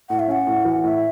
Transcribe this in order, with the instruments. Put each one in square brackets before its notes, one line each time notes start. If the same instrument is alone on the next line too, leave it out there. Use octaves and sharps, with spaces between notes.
[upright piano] A2 [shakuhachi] F#5
[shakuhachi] E5
[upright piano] C#4 [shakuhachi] F#5
[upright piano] A2
E3
[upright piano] A2 [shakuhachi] E5